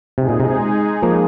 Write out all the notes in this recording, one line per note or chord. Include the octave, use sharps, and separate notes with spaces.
C3 G#3 D#4 G#4
A#2
C3
C3
F3 A#3